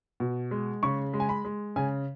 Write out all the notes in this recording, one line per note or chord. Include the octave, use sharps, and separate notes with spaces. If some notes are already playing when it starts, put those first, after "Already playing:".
B2
G#3
C#3 C#6
G#3
G#5
B5
G#3
C#3 G#5